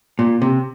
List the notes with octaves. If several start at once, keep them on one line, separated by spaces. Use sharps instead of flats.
A#2
C3